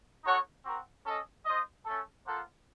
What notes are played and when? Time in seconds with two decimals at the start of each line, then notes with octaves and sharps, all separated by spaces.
0.23 D#4 F#4 A4 C#5 F#5
0.63 C4 F#4 A#4
1.04 C#4 A4 D#5
1.45 F4 C5 D#5
1.85 A3 C#4 A4
2.26 A#3 F4 A4 C5 F#5